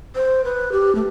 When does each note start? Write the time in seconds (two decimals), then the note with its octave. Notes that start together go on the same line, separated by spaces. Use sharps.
0.15 C5
0.44 B4
0.72 G4
0.95 A3